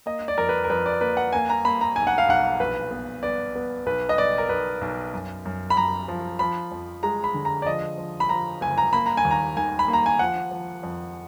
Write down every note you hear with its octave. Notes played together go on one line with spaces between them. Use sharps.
A#3 D#5
D5
F2 A#4
B4
A#4
F2 B4
D5
A#3 B4
F#5
A#3 G#5
A#5
A#3 B5
A#5
B1 G#5
F#5
F5
B1 F#5
A#1 B4
B3
B3 D5
B3
B1 B4
D#5
B1 D5
A#4
B1 B4
B1
F#2
F#2
B5
F#2 A#5
F3
F3 B5
F2
G#3 A#5
B5
D3
A#5
D5
F3 D#5
F3
B5
F3 A#5
F#1 G#5
A#5
A#3 B5
A#5
G#5
D#2
A#5
D#3 G#5
B5
A#3
A#5
G#5
F3 F#5
F3
F2